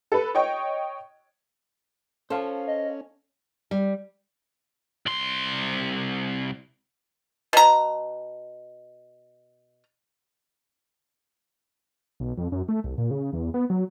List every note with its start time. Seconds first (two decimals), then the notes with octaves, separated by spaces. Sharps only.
0.12 A4 B4
0.35 C#5 D#5 G5 C#6
2.30 C#4 A4 C5 F5
2.67 D#5
3.71 G3
5.06 C2 C6
7.53 B2 A#5
12.20 B1
12.38 F2
12.52 F#2
12.69 A3
12.84 C2
12.98 A#2
13.11 C#3
13.33 E2
13.54 B3
13.70 F#3